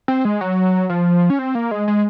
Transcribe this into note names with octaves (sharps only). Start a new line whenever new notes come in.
C4
G#3
F#3
F3
C#4
C4
A#3
G#3
G#3